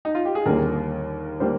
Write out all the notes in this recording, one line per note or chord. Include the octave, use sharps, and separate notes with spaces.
D#4
F4
G4
G#4
D#2 D3 G3 A#3 A#4
D3 G3 A#3 C5